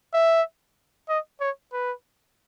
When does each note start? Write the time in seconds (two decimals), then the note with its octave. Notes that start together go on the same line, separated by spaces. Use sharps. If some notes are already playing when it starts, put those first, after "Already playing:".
0.14 E5
1.09 D#5
1.40 C#5
1.73 B4